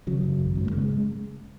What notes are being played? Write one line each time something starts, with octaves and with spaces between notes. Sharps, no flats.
C#3 F#3
F#2
G#1
G#2
A#3
C#3 G#3
G#3